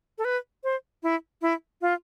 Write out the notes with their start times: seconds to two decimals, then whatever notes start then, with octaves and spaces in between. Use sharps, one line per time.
0.18 A4
0.25 B4
0.64 C5
1.03 E4
1.42 E4
1.82 F4